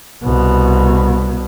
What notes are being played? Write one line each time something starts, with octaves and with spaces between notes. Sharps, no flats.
C2 B2